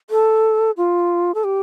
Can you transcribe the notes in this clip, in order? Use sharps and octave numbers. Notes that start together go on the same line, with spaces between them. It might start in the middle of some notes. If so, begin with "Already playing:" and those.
A4
F4
A4
G4